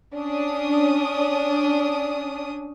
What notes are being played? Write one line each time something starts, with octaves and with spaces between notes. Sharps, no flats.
C#4 D4 D#6